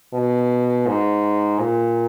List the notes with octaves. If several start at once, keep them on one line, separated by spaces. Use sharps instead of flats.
B2
G#2
A#2